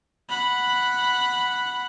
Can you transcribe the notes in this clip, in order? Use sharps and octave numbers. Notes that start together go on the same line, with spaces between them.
F#5 B5